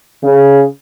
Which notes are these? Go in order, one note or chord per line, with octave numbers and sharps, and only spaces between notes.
C#3